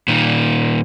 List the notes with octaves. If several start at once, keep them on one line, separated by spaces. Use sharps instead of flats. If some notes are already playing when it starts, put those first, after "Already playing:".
A#2 D#3